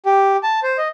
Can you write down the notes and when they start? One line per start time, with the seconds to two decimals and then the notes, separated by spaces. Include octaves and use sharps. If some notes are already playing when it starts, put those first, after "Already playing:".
0.06 G4
0.43 A5
0.63 C5
0.78 D#5